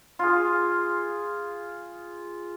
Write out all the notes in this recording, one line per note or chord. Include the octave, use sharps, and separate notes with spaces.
F4 G#4